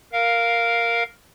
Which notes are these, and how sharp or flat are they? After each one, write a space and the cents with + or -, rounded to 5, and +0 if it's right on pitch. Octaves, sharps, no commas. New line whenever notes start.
A#4 +0 F5 +0